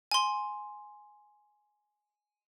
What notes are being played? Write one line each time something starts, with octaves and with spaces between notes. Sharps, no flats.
G#5 C6